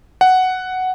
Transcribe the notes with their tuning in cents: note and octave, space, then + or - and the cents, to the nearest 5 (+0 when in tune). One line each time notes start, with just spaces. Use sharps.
F#5 +5